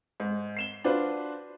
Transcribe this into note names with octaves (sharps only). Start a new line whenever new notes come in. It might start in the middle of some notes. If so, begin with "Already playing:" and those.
G#2
C7 E7 G7
D4 F4 F#4 B4 C5